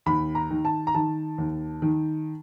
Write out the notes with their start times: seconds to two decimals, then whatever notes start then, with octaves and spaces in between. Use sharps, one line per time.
0.06 D#2 B5
0.35 A#5
0.50 D#3
0.65 A5
0.87 A#5
0.94 D#3 A5
1.38 D#2
1.82 D#3